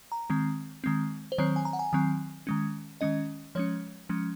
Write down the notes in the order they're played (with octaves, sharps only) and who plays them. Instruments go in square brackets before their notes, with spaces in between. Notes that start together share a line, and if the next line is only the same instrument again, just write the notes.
[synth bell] A#5
D#3 G#3 C4
D#3 G#3 C4
C5
D#3 F#3 C4 C#5
G#5
A#5
F#5
G#5
D#3 F#3 C4
D#3 G#3 C#4
D#3 G#3 C#4 D#5
F3 G#3 C#4 C#5
F3 G#3 C#4